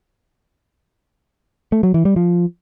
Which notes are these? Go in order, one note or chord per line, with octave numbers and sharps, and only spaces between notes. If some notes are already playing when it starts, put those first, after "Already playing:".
A3
F#3
E3
G3
F3